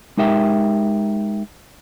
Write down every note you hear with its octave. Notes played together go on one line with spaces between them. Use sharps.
G#3 D#4 G4 A#4 E5 G5